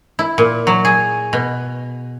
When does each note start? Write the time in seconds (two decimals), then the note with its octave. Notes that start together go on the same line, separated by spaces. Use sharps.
0.19 E4
0.38 A#2
0.67 F#3
0.85 G#4
1.33 B2